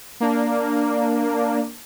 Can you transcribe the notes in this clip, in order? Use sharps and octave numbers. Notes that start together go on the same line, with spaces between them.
A#3 D4